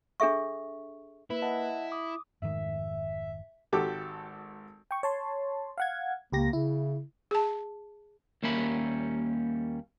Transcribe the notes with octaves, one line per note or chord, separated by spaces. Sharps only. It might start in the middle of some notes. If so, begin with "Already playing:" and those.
D4 G#4 A4 E5 C#6
A#3 E4 B4
D#5 F#5 A5
D6 D#6
F1 G#2 D#3 E5
G#1 F#4 G4 A4 D6
G5 C#6
C#5 A5 C6
F5 F#5 G#6
C#2 A#3 G4 A#6
C#3 E4
G#4 A5
D#2 G3 A#3 C#4 E5 B5